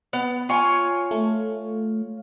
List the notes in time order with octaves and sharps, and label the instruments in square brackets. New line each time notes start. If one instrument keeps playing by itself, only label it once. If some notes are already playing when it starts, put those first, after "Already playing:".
[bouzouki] B3
F4 C#5 G#5
[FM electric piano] A3